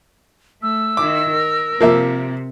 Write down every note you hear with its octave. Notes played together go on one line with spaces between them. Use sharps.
A3 E6
D#3 E4 D6
A#4
C3 F3 A#3 A#4 E5